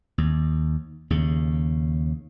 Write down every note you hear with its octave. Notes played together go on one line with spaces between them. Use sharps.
D#2
D#2 C#3